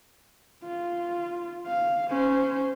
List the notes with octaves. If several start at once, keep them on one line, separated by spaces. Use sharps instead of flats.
F4
F5
C#4 C5